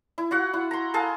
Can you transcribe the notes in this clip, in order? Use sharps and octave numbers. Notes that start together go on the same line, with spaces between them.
E4
F4 F#4 F#5
E4
A#5 C6
G#4 A4 F5 A5